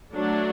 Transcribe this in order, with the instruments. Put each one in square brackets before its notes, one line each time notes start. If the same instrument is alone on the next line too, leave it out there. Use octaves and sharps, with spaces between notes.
[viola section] F#3 A3 D4